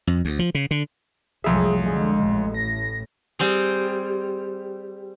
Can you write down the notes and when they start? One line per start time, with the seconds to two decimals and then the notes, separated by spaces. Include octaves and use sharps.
0.07 F2
0.25 D2
0.39 F3
0.55 C#3
0.71 D3
1.44 C2 F2 F#3 A3 G#4 E5
1.86 D3 G#3
2.19 A1 A2
2.54 A#6
3.39 G3 C4 G#4